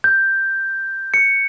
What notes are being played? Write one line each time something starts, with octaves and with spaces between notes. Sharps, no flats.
G6
C#7